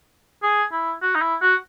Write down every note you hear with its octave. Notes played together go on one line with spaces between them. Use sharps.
G#4
E4
F#4
D#4
E4
F#4